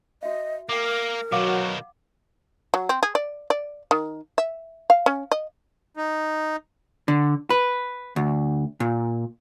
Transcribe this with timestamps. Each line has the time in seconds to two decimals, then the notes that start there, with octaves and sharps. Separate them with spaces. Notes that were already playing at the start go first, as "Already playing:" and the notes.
0.23 F#4 D#5 E5
0.69 A#3 A#4 G5 D6
1.32 B2 D#3 F#3 F#4 F5 F#5 D6
2.74 F#3
2.89 C4
3.03 G#4
3.15 D5
3.50 D5
3.91 D#3
4.38 E5
4.90 F5
5.06 C#4
5.32 D#5
5.97 D#4
7.08 D3
7.50 B4
8.16 D2
8.80 A#2